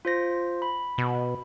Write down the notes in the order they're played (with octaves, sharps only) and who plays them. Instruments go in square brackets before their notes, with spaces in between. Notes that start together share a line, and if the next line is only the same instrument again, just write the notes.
[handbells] F4 C5 A#6
B5
[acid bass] B2